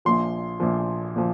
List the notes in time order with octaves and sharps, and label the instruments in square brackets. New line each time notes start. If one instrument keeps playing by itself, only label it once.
[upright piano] A#1 A#2 F3 C6
A#1 A#2 F3
A#2 F3